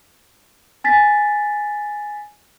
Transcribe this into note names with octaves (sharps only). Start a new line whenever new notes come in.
G#5 A6 B6